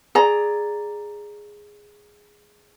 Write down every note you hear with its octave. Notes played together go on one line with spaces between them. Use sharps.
G#4 D5 A#5